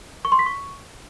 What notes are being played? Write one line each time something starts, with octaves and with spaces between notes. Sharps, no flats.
C#6
C6
B6
C#6